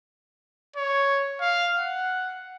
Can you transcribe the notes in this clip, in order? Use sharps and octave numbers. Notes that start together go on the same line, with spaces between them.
C#5
F5
F#5